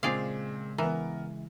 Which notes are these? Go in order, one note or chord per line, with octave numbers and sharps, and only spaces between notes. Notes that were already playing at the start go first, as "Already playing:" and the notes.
A#2 C#3 G#3 C4 G#4 D5 F5
E3 B3 A#4